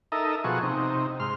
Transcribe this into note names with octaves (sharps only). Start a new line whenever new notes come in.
D#4 A4 A#4 D#5 E5
B2 F3 F#4 G#4 C#6
C3 D#4
G#2 C6 F6